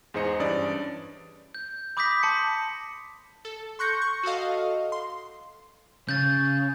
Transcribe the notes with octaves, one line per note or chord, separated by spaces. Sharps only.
E2 G#2 G#4 C5 D#5 C#7
G2 E3 C#4 D4 D5 D#6
G6
B5 D6 D#6 G6 A#6 B6
A5 C6 C#7
A4
C6 C#6 F#6 G6 A#6 C#7
C#6
F#4 A4 D#5 F5
C6
C#3 G6 A6